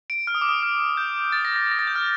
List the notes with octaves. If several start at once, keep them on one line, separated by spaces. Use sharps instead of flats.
D7
F6
D#6
D6
D#6
F6
G6
A6
A#6
A#6
A#6
A6
G6
F6